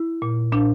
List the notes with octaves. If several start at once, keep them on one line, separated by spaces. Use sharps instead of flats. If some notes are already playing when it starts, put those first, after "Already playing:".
Already playing: E4
A#2
A#2 D4